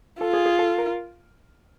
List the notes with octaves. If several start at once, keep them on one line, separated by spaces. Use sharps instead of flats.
F4 A4
G#4
G#4
A4
A#4